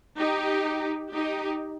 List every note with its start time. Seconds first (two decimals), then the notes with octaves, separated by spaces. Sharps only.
0.18 D#4 G4
1.13 D#4 G4